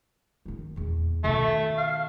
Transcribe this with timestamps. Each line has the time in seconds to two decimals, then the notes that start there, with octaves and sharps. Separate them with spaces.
0.45 D#3 F#3
0.76 E2 A#2
1.24 B2 D#3 A3
1.78 F5